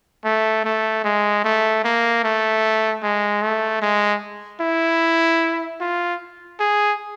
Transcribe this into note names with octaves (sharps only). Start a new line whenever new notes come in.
A3
A3
G#3
A3
A#3
A3
G#3
A3
G#3
E4
F4
G#4